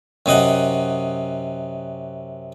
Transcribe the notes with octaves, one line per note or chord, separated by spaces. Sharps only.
F#2 C3 D#5 F#5